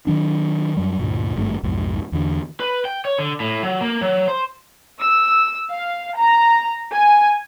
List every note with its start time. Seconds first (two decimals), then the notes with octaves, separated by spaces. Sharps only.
0.07 D#3 F#3 D4
0.77 F#2 F#3 G3
0.99 D2 G2 A#2
1.36 G#1 G2 D3 A3
1.63 B1 F2 G#2
2.12 E2 D3
2.60 B4
2.85 G5
3.05 C#5
3.18 D3
3.40 A2
3.63 F#3
3.81 A#3
4.01 F#3
4.28 C5
4.99 E6
5.73 F5
6.17 A#5
6.93 G#5